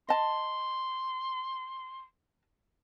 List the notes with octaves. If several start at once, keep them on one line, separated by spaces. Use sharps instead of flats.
D#5 A5 C6